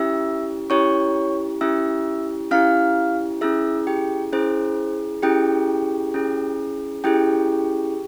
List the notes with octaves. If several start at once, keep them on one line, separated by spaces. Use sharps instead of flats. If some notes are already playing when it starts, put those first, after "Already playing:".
Already playing: C#4 E4 G4 E5 E6
C#4 E4 G4 C#5 C#6
C#4 E4 G4 E5 E6
C#4 E4 G4 F5 F6
C#4 E4 G#4 E5 E6
G4 G5
C#4 E4 G#4 C5
C#4 E4 G4 G#4 G5
C#4 E4 G#4
C#4 E4 G4 G#4 G5